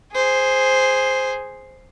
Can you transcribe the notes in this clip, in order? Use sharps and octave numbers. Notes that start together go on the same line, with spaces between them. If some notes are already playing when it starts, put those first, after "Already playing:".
G#4 C5